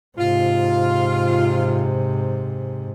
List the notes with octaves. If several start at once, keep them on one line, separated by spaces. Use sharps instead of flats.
G#2 C3 F4